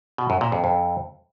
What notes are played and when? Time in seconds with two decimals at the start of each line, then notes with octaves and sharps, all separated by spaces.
0.18 B2
0.30 F#2
0.41 A#2
0.52 F2
0.64 F2